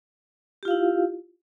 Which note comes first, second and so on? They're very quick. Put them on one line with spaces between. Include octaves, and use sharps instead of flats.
G4 F4 F5 E4